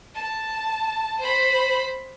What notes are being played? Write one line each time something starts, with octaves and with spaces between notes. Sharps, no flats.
A5
C5 B5